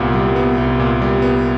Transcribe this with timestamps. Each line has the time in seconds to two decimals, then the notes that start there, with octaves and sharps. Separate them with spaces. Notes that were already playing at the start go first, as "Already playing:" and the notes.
Already playing: C2 A#2 G3 B3
0.14 G3
0.36 B3
0.58 C2
0.79 A#2
1.02 G3
1.22 B3